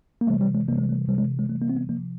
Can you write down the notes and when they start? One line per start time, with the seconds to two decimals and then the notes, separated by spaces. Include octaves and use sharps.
0.21 A#3
0.27 C3 E3 G3 A3
0.41 G3
0.55 G#3
0.68 C3 E3 G3 A#3
0.78 G#3
0.89 A3
1.08 C3 E3 G3
1.18 G#3
1.39 G#3
1.49 C3 E3 G3 A3
1.62 A#3
1.69 C4
1.76 B3
1.89 C3 F3 A#3